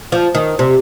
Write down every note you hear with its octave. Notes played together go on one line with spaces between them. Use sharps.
F3
D#3
C3